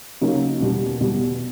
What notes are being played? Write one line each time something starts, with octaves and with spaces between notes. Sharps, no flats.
C#3 F#3 A#3 D#4
E2 B2 G3
E2 B2 G3